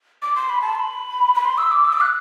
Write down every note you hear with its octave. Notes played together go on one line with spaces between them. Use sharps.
D6
C6
B5
A5
C6
B5
B5
C6
E6
D6
E6
D6
F#6